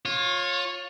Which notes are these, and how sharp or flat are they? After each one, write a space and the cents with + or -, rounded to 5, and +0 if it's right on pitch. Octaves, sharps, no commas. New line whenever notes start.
F4 +20 C#5 -15